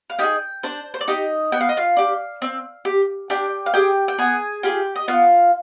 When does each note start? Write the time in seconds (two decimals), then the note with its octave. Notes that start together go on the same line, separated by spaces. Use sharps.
0.10 F5
0.19 D#4 G4 G#4 G5
0.63 D4 C5
0.94 C5
1.01 D5
1.08 D#4 G4 D#5
1.52 B3 G5
1.61 F5
1.69 D#5
1.77 F4 F5
1.97 D4 G4
2.42 C4
2.85 G4
3.30 D4 G4 G5
3.66 F5
3.74 G4 G#4 G5
4.08 G5
4.18 B3 G#4 G#5
4.63 F4 G4 G#4 G5
4.96 D#5
5.08 B3 F4 F5